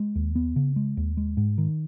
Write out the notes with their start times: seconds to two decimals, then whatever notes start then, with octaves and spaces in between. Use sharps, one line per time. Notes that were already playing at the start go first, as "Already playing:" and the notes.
Already playing: G#3
0.15 D#2
0.35 B3
0.56 C#3
0.76 G#3
0.97 D#2
1.17 G#3
1.37 G#2
1.58 D#3